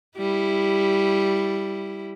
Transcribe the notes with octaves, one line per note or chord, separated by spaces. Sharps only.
G3 E4